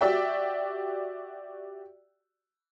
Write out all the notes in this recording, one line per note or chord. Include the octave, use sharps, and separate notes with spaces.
F#4 G4 D5 E5 G5